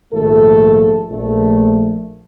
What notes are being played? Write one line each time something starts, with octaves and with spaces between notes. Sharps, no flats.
A#1 G#2 D#3 A3 A4
A#1 A3